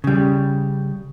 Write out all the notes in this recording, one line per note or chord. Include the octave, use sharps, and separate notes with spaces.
C#3 G3